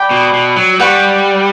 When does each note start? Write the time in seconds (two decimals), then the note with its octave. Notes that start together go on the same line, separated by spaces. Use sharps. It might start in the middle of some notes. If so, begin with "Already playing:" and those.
Already playing: D5 G5 B5
0.11 B2
0.33 B2
0.56 F#3
0.80 G3 B4 F#5 C#6